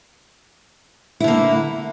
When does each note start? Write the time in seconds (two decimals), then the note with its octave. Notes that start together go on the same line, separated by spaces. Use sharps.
1.20 E4
1.24 D3
1.28 A#3